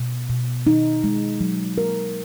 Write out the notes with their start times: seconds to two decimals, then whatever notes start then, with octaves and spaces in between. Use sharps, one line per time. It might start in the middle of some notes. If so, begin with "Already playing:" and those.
Already playing: B2
0.30 B2
0.67 D#4
1.04 G#3
1.41 F#3
1.78 A#4